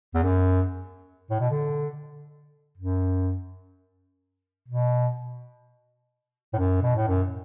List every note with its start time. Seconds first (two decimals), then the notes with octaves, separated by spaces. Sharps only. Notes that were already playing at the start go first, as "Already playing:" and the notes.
0.14 E2
0.23 F#2
1.30 A2
1.40 B2
1.50 D3
2.78 F#2
4.68 B2
6.53 A2
6.58 F#2
6.82 B2
6.96 A2
7.08 F#2